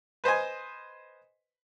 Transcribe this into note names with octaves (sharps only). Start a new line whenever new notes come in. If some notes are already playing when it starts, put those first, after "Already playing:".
B4 C5 D#5 G#5